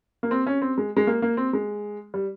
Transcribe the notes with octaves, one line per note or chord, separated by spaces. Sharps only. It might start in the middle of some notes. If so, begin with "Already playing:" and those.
A#3
C4
C#4
C4
G#3
G#3
A#3
A#3
C4
G#3
G3